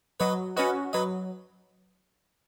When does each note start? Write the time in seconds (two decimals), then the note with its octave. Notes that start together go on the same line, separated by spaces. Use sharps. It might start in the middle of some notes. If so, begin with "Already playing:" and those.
0.20 F#3 B4 D#5
0.56 C#4 F#4 B4 D#5
0.93 F#3 B4 D#5